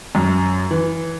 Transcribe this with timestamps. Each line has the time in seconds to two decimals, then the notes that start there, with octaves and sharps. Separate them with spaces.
0.15 F#2
0.71 E3